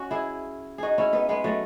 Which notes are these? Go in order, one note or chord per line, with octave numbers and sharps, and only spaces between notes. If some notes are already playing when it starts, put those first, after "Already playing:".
Already playing: C#4 F#4
E4 G#4
D#4 F#4 G#4
C#4 E4
B3 D#4
G#3 B3
F#3 A3